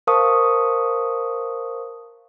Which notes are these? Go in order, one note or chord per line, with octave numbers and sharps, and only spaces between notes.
A#4 C5 F5 A5 C#6 D#6